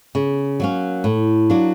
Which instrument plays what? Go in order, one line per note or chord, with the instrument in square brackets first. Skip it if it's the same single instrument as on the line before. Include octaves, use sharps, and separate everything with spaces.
[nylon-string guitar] C#3
F#3 A#3 C#4
A2
F#3 A#3 D4